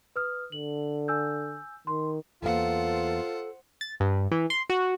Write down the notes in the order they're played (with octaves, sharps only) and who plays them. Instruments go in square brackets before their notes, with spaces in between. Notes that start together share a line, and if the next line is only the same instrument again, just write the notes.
[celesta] B4 D#6 F6
[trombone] D3 [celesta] F#7
[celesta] G#5 E6 G6
[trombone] D#3 [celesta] C6
[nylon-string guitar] E2 A#3 F5 [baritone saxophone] F4 [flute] A4 [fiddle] C5 F#5
[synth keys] A6
G2
E3
C6
F#4